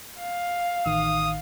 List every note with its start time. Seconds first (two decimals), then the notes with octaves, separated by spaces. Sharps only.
0.20 F5
0.86 A1 D#3 D#6